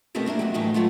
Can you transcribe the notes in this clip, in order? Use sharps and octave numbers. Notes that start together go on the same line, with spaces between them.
B2 A3 B3 C4 G4 A#4
A#3 D4 E4 A#4
E2 G2 F#3
E2 A2 E3 F#3 D#4 G5
F#3 A3 B3 F4